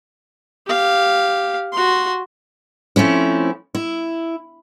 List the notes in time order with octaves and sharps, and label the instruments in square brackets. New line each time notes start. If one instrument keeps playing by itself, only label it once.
[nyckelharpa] G4 F5
F#4 C6
[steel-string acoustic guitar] F3 A3 C4 C#4 E4
E4